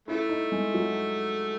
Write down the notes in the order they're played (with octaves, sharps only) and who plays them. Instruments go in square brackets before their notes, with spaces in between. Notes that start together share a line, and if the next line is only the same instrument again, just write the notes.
[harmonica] C#3 A3 [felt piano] E4
[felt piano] D#4
G#3
F#3